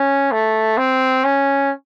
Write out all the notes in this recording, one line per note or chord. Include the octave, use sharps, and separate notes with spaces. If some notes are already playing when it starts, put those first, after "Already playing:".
Already playing: C#4
A3
C4
C#4